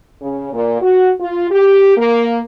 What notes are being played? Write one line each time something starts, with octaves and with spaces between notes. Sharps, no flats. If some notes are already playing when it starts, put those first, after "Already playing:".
C#3
A#2
F#4
F4
G4
A#3